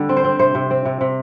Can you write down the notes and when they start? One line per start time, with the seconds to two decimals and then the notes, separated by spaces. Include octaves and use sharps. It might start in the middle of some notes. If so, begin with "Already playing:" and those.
Already playing: D3 G3
0.09 C4
0.16 C5
0.24 C4
0.39 C3 C5
0.55 C3
0.71 C4
0.85 C3
1.01 C3